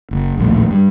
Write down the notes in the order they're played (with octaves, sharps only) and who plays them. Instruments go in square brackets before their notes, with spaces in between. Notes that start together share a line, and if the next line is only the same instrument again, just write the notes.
[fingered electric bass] F#1
A#1 D#2 A2
G2